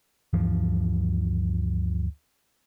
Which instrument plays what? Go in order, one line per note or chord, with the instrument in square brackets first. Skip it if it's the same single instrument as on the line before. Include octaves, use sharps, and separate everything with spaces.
[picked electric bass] D2 G2 E3 F3